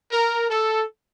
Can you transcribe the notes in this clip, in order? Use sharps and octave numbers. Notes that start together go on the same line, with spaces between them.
A#4
A4